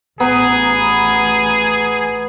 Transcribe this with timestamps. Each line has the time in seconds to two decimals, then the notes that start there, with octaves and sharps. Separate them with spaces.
0.20 A1 B3 G#4 A#5